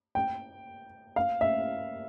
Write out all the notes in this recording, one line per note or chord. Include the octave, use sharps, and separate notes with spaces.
G5
F5
E5